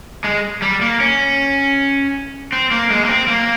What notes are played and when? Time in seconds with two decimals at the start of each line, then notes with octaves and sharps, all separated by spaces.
0.24 G#3
0.62 G3
0.81 A#3
1.00 C#4
2.52 C4
2.71 A#3
2.90 G#3
3.05 A#3
3.09 C4
3.28 A#3